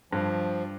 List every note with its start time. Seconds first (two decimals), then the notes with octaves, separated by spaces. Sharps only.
0.12 G2 F3